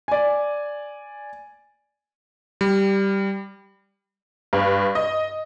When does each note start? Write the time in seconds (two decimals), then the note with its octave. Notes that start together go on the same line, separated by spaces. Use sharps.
0.08 D5 G#5
2.61 G3
4.53 G2
4.95 D#5